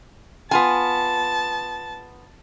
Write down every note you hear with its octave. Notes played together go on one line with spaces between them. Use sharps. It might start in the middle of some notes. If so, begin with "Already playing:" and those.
B3 F4 G#5 A5